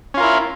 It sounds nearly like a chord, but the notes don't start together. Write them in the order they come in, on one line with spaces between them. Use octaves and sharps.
C#4 F4 A#4 E4